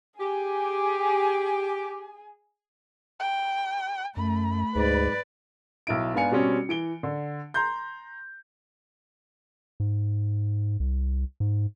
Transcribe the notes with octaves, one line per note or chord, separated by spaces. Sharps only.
G4 G#4 G#5
G5
F#2 A3 B5
D2 G#2 B4 D5
B1 E4 D7
G#2 B3 D4 F5 G#5 C#7
B2 G3 C4 C#4
E3 D7 G7
D3
A#5 C6 G6
G#2
C2
G#2